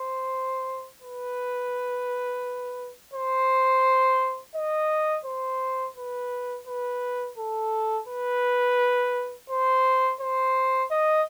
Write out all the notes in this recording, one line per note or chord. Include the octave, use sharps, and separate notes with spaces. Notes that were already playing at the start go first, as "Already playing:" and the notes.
Already playing: C5
B4
C5
D#5
C5
B4
B4
A4
B4
C5
C5
D#5